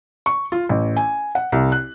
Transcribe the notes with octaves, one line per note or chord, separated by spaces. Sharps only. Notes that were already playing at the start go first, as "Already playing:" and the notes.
C#6
F4
A1
G#5
F#5
C2
F#6